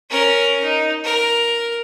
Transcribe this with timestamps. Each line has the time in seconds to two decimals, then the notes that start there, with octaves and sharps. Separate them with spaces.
0.10 C#4 A#4
0.64 D#4
1.04 A#4